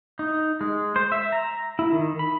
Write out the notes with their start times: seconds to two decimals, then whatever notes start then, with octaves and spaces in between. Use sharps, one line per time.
0.19 D#4
0.61 G#3
0.96 C5
1.12 E5
1.32 A#5
1.79 E4
1.92 D#3
2.19 B5